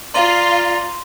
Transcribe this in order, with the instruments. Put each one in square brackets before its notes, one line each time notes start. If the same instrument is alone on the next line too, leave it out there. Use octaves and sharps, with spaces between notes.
[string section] F4 [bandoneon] D5 A#5 [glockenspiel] C6 D#7 G7